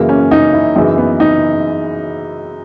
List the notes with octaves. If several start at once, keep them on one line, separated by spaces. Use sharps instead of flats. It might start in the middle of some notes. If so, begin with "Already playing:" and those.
Already playing: F#2 C#3 E3 A#3
C#4
D#4
E4
F#2 C#3 E3 D#4
B3
D#4